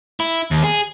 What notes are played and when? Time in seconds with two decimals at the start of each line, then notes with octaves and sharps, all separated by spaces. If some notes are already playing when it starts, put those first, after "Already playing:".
0.20 E4
0.51 D#2
0.64 G#4